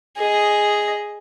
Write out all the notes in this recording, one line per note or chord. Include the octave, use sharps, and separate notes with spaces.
G#4 D#5